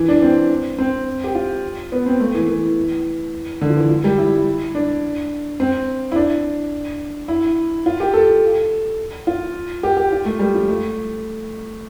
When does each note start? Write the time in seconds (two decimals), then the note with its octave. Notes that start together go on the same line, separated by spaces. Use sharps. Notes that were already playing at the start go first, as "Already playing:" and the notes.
Already playing: E3
0.08 D4
0.22 C4
0.79 C4
1.24 G4
1.35 F4
1.92 B3
2.06 C4
2.20 A3
2.35 E3
2.48 E3
3.61 D3
3.69 F3
3.76 E3
3.89 F3
4.04 G3
4.18 E4
4.75 D4
5.60 C4
6.12 E4
6.16 D4
7.28 E4
7.86 F4
8.00 G4
8.14 A4
9.27 F4
9.83 G4
9.97 G4
10.12 F4
10.25 A3
10.39 G3
10.55 F3
10.68 A3